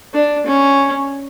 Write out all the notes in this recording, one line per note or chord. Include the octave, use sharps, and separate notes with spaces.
D4
C#4